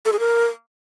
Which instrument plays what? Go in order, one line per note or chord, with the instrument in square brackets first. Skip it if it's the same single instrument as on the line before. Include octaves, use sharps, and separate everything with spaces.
[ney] A4
G#4
A#4